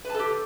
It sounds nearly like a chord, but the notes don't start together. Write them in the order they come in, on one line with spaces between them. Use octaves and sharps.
B4 A5 A4 G4